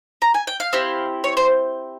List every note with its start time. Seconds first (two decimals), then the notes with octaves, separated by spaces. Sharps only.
0.22 A#5
0.34 G#5
0.47 G5
0.60 F5
0.73 C4 E4 G4
1.24 C#5
1.37 C5